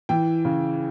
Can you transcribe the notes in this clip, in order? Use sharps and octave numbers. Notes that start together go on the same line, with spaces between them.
E3 G5
C#3